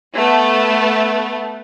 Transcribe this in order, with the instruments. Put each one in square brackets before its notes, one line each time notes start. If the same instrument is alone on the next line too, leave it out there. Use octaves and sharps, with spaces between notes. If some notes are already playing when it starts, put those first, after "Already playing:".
[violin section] A3 B3